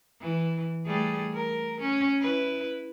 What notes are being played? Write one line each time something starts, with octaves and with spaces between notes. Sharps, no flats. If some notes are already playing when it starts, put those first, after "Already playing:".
E3
G3 A3 G#4
A#4
C#4
E4 B4